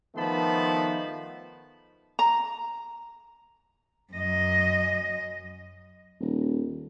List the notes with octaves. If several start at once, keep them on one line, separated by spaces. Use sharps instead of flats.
D#3 F3 A3 B3 A5 B5
A#5
F#2 D#5
D#1